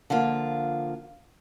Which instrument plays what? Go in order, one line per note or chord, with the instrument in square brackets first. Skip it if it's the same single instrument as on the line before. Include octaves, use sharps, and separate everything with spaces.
[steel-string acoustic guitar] D3 F3 A#3 F4